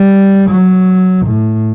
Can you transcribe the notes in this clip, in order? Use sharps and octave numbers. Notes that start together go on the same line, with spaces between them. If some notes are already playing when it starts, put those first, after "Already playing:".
Already playing: G3
F#3
A2